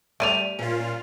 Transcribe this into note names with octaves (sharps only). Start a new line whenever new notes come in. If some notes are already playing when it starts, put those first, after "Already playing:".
G3 A3 C5 D5 D7 D#7 F7
A#2 C#4 F4